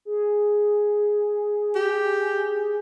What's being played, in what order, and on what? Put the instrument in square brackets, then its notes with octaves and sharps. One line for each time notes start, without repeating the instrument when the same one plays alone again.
[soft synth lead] G#4
[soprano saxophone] G4